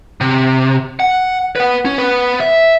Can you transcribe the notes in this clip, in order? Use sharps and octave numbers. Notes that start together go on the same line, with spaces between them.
C3
F#5
B4 F#5
C#4
B3 B4
E5